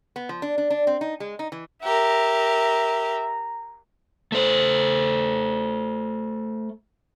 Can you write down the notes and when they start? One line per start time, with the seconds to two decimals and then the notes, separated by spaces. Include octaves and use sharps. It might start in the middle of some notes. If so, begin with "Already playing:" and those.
0.16 B3
0.29 F3
0.42 D4
0.58 D4
0.70 D4
0.87 C4
1.01 D#4
1.20 G#3
1.39 D#4
1.52 E3
1.83 G4 A#4 E5 A#5
4.32 A3 C5